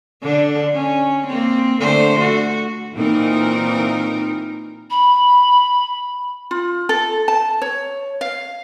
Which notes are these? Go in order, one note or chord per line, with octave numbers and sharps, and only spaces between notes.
D3 D4
C#4
A#3 C4
D3 A3 C5
F#4
A#2 E3 C4 D#4 A#4
B5
F4
A4
A5
C#5
F5